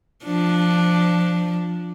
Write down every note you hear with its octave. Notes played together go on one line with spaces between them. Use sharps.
F3 D4